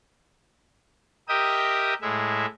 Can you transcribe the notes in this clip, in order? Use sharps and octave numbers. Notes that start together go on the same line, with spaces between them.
G4 A#4 D#5 E5 G5 D#6
A2 G#3 E5